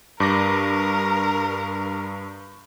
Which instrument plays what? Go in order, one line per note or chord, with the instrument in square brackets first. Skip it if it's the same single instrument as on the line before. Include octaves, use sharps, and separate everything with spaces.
[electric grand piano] G2 D6 A#6 [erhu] A#4